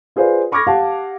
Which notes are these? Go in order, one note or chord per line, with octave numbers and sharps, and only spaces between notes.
F4 G#4 B4 C5 D5 F5
B5 C#6 D6 F6 G#6 A#6
G4 F5 F#5 A5